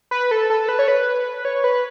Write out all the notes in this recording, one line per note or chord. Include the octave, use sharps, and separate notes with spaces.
B4
A4
A4
B4
C#5
B4
C#5
B4